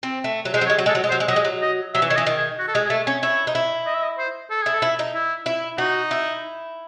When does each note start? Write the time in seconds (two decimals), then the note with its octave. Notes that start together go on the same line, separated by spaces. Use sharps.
0.03 C4
0.24 A3
0.45 F#3
0.54 G#3 C5
0.61 F#3
0.67 C#5
0.70 G#3
0.78 F#3
0.86 G#3 A4
0.95 F#3
1.04 G#3
1.09 F#3 C5
1.20 G#3
1.28 F#3 D#5
1.36 G#3
1.45 F#3
1.62 D#5
1.95 F#3 E5
2.02 E3
2.09 D#3 C#5
2.16 E3 D#5
2.26 D#3
2.37 G#4
2.58 F#4
2.68 A4
2.75 G#3 G#4
2.86 G#4
2.90 A3 A4
3.06 C#4 C#5
3.22 E4 C#5
3.47 D#4
3.55 E4
3.86 D#5
3.95 E5
4.03 D#5
4.18 C5
4.50 A4
4.62 E4 G#4
4.74 A4
4.82 E4
4.99 D#4
5.15 E4
5.46 E4
5.78 D#4 F#4
6.11 E4